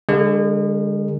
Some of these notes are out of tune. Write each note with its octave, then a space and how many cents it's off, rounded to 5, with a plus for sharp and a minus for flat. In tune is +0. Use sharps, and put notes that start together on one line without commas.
D3 +0 G#3 -35 A#4 -35